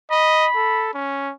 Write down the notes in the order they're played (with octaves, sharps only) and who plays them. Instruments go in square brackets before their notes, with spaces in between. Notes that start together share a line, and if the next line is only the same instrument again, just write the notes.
[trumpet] D#5 [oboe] B5
[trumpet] A4
C#4